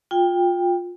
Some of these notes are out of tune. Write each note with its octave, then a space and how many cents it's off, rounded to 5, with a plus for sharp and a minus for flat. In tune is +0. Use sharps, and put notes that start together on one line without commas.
F4 +20 G5 +15